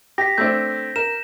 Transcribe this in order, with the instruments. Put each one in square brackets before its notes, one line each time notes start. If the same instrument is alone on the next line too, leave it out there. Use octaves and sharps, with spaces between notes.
[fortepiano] G4 [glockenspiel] A#6 B6
[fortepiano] A3 C4 D4 [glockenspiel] G6
[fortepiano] A#4 [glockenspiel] E7